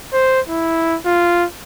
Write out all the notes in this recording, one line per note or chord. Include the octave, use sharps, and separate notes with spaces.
C5
E4
F4